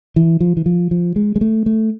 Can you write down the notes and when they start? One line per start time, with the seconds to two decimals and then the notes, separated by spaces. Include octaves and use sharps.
0.16 E3
0.40 F3
0.57 E3
0.66 F3
0.91 F3
1.16 G#3
1.36 G#3
1.41 A3
1.66 A3